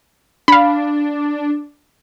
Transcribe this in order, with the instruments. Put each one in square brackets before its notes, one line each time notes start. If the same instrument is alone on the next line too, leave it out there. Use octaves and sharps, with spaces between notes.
[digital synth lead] D4 [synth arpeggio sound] F5 B5